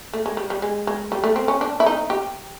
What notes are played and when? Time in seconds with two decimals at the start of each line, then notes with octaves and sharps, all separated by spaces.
0.13 A3
0.26 G#3
0.37 G3
0.50 G3
0.62 G#3
0.87 G#3
1.12 G3
1.24 A3
1.36 C4
1.48 C#4
1.61 D4
1.80 E4
1.86 D#4
2.10 G4